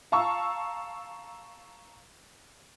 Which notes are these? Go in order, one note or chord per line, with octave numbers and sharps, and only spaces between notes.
F5 A5 A#5 C#6 E6